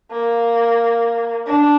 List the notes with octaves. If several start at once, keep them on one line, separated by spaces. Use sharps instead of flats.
A#3
D4